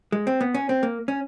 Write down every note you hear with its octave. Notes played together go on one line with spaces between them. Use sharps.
G#3
C4
B3
C#4
C4
A#3
C#4